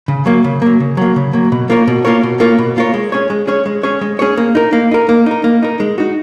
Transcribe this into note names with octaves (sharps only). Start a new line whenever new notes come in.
C#3
F#3 A#3
C#3
F#3 A#3
C#3
F#3 A#3
C#3
F#3 A#3
B2
A#3 F4 A#4 C#5
B2
A#3 F4 A#4 C#5
B2
A#3 F4 A#4 C#5
B2
A#3 F4 A#4 C#5
G#3
C#4 G#4 C#5
G#3
C#4 G#4 C#5
G#3
C#4 G#4 C#5
G#3
C#4 G#4 C#5
A#3
D#4 A#4
A#3
D#4 A#4
A#3
D#4 A#4
A#3
D#4 A#4
G#3
D#4 F#4